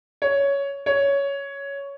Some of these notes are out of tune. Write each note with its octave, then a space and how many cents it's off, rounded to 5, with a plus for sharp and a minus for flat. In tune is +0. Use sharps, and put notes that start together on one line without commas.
C#5 +10
C#5 +10